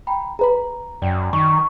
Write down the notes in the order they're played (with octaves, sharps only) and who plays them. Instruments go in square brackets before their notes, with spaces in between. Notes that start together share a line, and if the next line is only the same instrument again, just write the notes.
[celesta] G5 A#5 B5
[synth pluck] G#4 B4 B5 [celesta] A#5
[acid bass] F#2 [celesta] D5 G5
[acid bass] D#3 [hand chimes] C#6